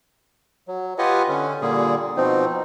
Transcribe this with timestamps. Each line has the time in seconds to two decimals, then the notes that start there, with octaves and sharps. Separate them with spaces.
0.68 F#3
0.98 F4 G4 B4 D#5 F#5 G#5
1.29 D3 C#4
1.62 A#2 D3 G3 A#3 G#4
2.17 B2 F3 C4 D#4